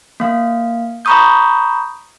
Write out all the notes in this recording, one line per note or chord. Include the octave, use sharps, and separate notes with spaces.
A#3 F5
A#5 B5 C#6 D#6 G6